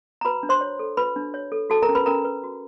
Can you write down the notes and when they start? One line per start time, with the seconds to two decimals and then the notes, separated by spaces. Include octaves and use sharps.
0.21 A#5
0.25 F#4 B4 B5
0.43 D4
0.49 C5 C6
0.61 C#5
0.79 A4
0.97 F#4 B4 B5
1.16 D4
1.34 C#5
1.52 A4
1.70 F#4 A4 A5
1.82 A#4 A#5
1.89 C#4
1.95 B4 B5
2.06 C#4 A#4 A#5
2.24 B4
2.43 F#4